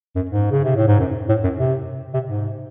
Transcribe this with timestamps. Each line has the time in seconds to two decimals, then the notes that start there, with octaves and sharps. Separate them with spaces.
0.16 F#2
0.30 G#2
0.51 C#3
0.64 C3
0.76 A2
0.88 G#2
1.00 F#2
1.29 A2
1.44 F#2
1.57 C3
2.14 C3
2.28 G#2